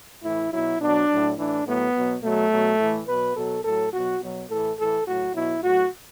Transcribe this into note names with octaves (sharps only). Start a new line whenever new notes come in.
A2 E3 E4
B2 F#3 E4
B2 F#3 D4
A2 F#3
A2 E3 D4
A2 F#3 B3
B2 F#3
B2 F#3 A3
B2 F#3
A2 E3
B2 F#3 B4
B2 F#3 A4
A2 F#3 A4
B2 F#3 F#4
B2 F#3
A2 E3 A4
A2 E3 A4
A2 F#3 F#4
B2 F#3 E4
A2 F#3 F#4